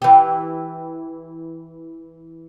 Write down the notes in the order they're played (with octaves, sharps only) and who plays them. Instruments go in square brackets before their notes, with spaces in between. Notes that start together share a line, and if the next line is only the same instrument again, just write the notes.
[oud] E3 G4